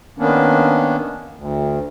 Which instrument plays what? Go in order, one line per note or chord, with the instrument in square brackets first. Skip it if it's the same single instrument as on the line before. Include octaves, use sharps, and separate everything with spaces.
[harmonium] D#3 A#3 B3 C#4 D4
D2